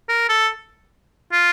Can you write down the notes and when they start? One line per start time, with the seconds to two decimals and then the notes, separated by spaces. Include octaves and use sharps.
0.09 A#4
0.29 A4
1.32 F4